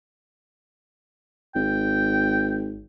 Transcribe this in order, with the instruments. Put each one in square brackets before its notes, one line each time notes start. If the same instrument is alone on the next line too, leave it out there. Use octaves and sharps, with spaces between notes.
[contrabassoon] G#1 [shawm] G5